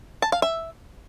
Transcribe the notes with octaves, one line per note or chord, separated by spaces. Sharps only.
A5
F5
E5